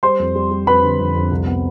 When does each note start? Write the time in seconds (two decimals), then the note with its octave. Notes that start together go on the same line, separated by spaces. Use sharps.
0.03 G3 C5 C6
0.19 F2
0.35 G3
0.51 G3
0.67 F2 B4 B5
0.83 D3
1.00 F2
1.15 F2
1.31 C2
1.46 B3